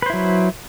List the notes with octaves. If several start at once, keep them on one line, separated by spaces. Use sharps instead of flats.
F#3 E4 B4 C5